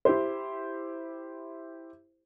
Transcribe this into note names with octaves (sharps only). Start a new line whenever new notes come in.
E4 G4 C5